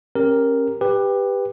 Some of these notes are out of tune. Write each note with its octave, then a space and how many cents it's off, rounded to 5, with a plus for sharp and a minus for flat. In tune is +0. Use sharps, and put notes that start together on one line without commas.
C#4 -30 G4 +0 A#4 +0
G4 +15 B4 +0 G5 +15